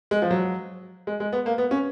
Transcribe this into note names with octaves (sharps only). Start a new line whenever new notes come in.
G#3
F3
F#3
G#3
G#3
B3
A#3
B3
C#4